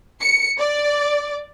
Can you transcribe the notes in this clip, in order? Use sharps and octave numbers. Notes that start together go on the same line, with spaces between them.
C#7
D5